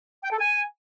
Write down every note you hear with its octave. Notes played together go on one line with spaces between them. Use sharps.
G5
A4
G#5